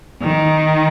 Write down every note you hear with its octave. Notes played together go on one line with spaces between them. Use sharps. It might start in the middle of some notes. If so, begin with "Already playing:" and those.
D#3